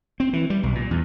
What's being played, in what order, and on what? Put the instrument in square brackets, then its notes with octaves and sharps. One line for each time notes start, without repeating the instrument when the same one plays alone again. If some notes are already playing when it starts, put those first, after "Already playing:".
[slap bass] C4
E3
G3
B1
A#2
E2